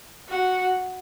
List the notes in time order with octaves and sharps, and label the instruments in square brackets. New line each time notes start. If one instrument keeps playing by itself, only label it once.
[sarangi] F#4